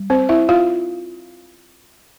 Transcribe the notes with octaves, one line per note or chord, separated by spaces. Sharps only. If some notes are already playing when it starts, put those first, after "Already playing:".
Already playing: G3
C4 C5
E4 E5
F4 F5